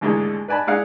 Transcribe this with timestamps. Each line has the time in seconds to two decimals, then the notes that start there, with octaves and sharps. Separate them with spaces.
0.01 D#2 G#2 D3 E3 G#3 A3
0.48 B4 D5 G#5 A5 B5
0.67 G#3 D4 E4 F5 F#5 G#5